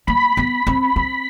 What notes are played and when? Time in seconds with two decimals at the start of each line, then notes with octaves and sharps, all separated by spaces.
0.07 A#3 B5
0.37 B3
0.67 C4
0.96 C4